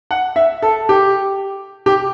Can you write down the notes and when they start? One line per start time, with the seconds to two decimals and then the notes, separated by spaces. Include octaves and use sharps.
0.11 F#5
0.36 E5
0.62 A4
0.89 G4
1.86 G4